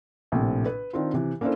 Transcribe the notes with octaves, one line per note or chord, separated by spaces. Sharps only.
A#1 A2 C3
B4
D#3 C4 D4 F4
C3 E3
A#3 C#4 D4 E4 A4 C5